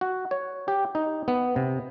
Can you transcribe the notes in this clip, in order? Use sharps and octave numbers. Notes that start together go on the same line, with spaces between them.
F#4
C#5
G4
D#4
B3
C3